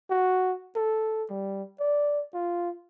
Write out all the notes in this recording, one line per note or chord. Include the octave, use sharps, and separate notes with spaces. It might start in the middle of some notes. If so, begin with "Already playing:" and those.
F#4
A4
G3
D5
F4